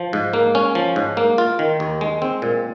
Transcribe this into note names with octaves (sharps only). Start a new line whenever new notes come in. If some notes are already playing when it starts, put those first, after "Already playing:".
Already playing: F3
G#2
A#3
C#4
F3
G#2
A#3
F4
D#3
D#2
G#3
C4
A#2